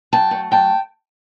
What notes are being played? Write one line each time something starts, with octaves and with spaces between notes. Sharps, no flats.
F#3 G5 A5
A3
F#3 G5 A5